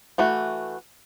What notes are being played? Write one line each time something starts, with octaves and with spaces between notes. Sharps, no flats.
E3 A3 F#4